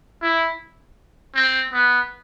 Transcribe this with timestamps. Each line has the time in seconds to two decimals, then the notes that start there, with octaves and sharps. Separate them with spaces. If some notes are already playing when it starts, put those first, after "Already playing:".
0.22 E4
1.35 C4
1.73 B3